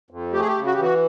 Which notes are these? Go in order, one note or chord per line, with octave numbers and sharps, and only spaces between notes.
F2
A3 G4
G#4
G4
C#3
F#4
G4
E3 F#4